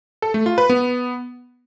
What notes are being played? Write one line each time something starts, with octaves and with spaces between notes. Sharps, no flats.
A4
A3
F4
B4
B3